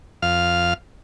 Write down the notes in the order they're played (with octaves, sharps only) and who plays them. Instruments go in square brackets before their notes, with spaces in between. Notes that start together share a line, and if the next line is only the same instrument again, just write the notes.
[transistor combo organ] F2 F5 F6